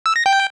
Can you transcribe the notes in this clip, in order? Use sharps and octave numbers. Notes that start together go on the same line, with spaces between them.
E6
A#6
G5